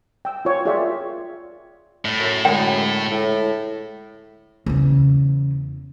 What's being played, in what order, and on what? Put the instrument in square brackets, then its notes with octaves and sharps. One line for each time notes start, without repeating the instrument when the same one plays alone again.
[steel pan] G5 E6
F4 C#5
F4 G#4 A#4 D5 E5 G5
[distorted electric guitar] A2
[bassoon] F#2
[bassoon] F#2 [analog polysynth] D3 G#3 [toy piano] G5
[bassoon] A2
[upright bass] E2 C#3